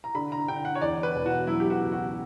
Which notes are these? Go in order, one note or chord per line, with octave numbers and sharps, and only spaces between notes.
A#5
D3 B5
A#5
D3 G5
F#5
C#5
E2 D5
B4
E1
F#4
F#3 E4
G4
F#4
C#2
F#4